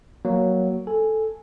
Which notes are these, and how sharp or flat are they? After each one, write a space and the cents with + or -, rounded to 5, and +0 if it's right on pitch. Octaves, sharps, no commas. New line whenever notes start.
F#3 +10 A#3 +15
A4 -5 G#5 +0